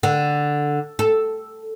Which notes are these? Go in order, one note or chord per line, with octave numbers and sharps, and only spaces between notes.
D3
A4